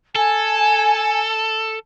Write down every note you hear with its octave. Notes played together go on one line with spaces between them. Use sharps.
A4 G#5